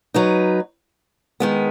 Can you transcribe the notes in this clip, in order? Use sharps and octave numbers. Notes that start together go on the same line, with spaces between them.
F#3 D#4 B4
D#3 G#3 B3